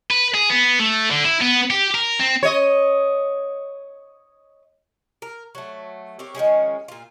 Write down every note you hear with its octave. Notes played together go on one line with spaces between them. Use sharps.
B4
G#4
B3
A3
D3
E4
B3
G4
A#4
C4
C#5 D#5
A#4
F#3 A3
C4 G4 A#4 C#5
D#3 F3 G#3 C#4
A#2 F4